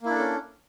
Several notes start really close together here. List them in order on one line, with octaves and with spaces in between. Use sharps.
A#3 E4 D4 A4 C#4